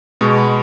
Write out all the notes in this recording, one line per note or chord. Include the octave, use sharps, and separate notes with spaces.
B2 G#3 B3 C#6
B5